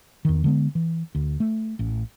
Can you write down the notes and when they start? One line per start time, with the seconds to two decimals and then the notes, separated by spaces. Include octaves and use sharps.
0.25 E2 D#3
0.44 D3 G#3 B3
0.75 E3
1.15 D2
1.40 A3
1.79 A1